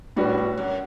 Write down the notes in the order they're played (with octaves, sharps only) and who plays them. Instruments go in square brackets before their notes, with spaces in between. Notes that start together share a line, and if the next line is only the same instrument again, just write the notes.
[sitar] F#2 [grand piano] A2 G3 D4 F#4 B4
[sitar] G2
F#2